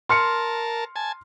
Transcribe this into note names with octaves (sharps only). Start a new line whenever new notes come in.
A#4 A5 C6 F6 C#7
G#5 A5